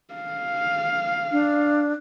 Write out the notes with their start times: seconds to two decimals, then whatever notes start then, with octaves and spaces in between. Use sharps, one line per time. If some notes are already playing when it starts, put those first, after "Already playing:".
0.14 F5
1.31 D4